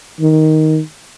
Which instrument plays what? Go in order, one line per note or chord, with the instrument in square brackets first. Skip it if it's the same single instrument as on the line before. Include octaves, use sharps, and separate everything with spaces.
[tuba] D#3